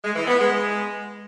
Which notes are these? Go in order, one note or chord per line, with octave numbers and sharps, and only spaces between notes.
G#3
E3
B3
G#3